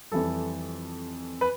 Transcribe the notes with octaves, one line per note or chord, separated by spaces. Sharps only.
F2 E3 G3 A4
B4